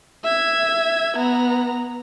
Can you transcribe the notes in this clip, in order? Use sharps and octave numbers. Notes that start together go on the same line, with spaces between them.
E5 G#6
B3 A#5